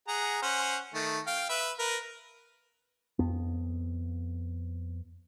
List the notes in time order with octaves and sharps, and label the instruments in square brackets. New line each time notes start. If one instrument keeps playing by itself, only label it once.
[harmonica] G#4 F#5 A#5
C#4 C5 F#5
D#3 A3
F5 G5
B4 E5
A#4 B4
[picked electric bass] F2 B3